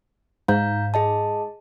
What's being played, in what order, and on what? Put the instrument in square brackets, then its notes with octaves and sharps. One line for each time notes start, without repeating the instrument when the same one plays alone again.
[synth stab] G#2 [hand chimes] F5 A#5 G6
[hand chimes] G#4 D#5 A5